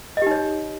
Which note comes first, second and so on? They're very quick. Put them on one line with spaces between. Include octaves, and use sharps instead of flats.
D#5 G4 D#4 C#5